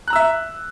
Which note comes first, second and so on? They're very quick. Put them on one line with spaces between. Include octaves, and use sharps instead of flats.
F#6 A#5 E6 E5